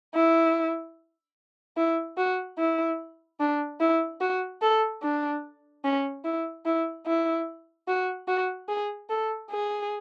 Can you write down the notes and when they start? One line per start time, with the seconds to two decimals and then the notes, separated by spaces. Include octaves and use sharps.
0.15 E4
1.77 E4
2.18 F#4
2.58 E4
3.40 D4
3.80 E4
4.21 F#4
4.62 A4
5.03 D4
5.85 C#4
6.24 E4
6.65 E4
7.06 E4
7.88 F#4
8.28 F#4
8.69 G#4
9.10 A4
9.51 G#4